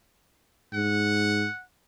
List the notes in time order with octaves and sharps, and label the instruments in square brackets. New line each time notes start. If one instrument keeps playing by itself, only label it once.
[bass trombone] G#2 [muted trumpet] F#5